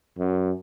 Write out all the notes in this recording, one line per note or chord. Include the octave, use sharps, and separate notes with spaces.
F#2